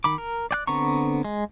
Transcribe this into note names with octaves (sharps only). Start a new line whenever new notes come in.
D#3 B5 D6
A#4
D5 G5 F#6
D3 B3 C4 A#5 C#6
G#3